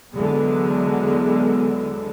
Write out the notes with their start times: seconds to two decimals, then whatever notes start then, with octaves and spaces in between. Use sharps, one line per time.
0.13 E2 D3 F#3 G#3 B3